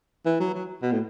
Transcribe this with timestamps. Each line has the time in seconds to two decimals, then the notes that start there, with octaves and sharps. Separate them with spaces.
0.26 E3
0.40 F#3
0.54 F#3
0.82 B2
0.92 A2